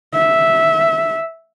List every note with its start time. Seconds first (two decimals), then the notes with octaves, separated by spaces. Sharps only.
0.14 E5